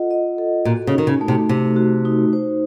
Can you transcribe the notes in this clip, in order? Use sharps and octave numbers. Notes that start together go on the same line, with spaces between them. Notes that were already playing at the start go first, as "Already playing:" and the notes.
Already playing: F4 A4 D#5 F#5
D#5
A4
A#2 F#4
C#3
D#3 D#4
C#3
A3
C3
C3 A3
F#4
D#4
C5